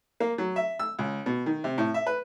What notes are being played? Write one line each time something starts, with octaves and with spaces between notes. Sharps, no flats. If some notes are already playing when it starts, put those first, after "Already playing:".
A#3
F#3
E5
E6
C#2
B2
D#3
C3
A2
E5
B4